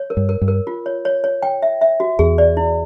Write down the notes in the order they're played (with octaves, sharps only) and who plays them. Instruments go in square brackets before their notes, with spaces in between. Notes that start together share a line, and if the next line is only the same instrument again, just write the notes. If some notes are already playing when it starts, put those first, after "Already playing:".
Already playing: [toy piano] C#5
A#4
[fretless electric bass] G2
[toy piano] A#4
[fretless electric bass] G2
[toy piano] A#4
F4
C#5
C#5
C#5
G5
E5
E5
F#4
[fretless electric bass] E2 [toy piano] G#4
[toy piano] D5
E4